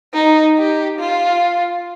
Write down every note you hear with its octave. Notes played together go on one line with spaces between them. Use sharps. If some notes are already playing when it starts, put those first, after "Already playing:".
D#4
G4
F4